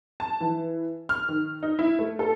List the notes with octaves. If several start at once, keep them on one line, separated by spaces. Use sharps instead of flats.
A5
E3
F6
D#3
D#4
E4
A3
A4